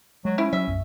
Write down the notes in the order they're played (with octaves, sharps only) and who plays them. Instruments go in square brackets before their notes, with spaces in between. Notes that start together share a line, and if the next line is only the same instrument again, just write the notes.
[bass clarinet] F#3 [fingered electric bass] G#3
[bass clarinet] C#4 [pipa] E4
[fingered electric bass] F#3 [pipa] E5
[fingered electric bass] B1 F#2